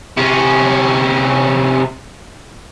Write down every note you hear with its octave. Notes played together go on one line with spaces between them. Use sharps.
C3 C#4